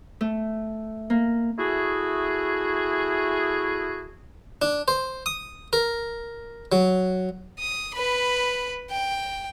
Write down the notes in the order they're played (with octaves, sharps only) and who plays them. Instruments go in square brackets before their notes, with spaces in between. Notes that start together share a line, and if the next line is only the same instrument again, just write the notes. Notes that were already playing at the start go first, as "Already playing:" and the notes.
[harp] A3
A#3
[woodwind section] A3 E4 F#4 G#4
[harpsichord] D4
C5
D#6
A#4
F#3
[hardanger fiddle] D#6
B4 B5
G5